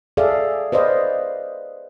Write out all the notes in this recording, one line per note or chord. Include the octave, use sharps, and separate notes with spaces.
G#4 A4 D5 E5 F5
B4 C5 D5 D#5 F5